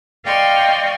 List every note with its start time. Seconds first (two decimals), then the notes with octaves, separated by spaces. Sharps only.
0.24 D5 D#5 F5 G5 C6 C#6